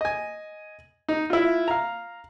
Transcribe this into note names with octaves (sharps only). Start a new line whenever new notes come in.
D#5 G#5
D#4
E4 F4
F5 A#5